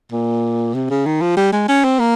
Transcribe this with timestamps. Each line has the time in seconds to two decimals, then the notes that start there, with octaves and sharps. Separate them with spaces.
0.12 A#2
0.74 C3
0.90 C#3
1.06 D#3
1.21 F3
1.37 G3
1.52 G#3
1.68 C#4
1.84 C4
1.99 A#3